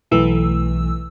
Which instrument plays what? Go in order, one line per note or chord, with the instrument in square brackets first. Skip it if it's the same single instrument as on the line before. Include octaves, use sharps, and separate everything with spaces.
[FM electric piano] B1 E3 A3 E6